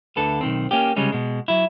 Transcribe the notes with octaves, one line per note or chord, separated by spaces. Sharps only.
D2 D3 A4 B4
B1 D#3 C4
A#3 C#4 G4
C2 C#3 G3 G#3 C#4
B2 G#3
F#3 E4